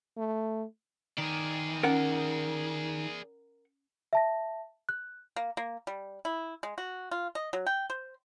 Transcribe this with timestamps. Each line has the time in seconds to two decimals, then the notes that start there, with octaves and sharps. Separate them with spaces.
0.17 A3
1.18 D#3 G#4 D5
1.83 C#4 A#4 F#5
4.13 E5 A5 A#6
4.89 F#6
5.36 A#3
5.57 A#3
5.87 G3
6.25 E4
6.63 G#3
6.78 F#4
7.11 F4
7.35 D#5
7.53 F#3
7.66 G5
7.90 C5